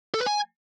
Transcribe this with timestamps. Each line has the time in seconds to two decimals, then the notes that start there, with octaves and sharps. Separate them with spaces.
0.14 A4
0.20 B4
0.26 G#5